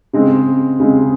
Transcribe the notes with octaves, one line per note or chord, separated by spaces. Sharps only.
C#3 G#3 C4
C#3 G#3 C4